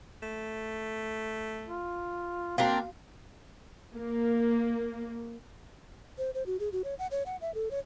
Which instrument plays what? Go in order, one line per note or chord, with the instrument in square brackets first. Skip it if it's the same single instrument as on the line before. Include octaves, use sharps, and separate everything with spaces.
[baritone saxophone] A3
[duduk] F4
[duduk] A#3 [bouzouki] C4 D4 A#4 [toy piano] F#4 F5
[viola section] A#3
[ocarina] C5
C5
F#4
G#4
F#4
C#5
F#5
C#5
F#5
E5
A4
C#5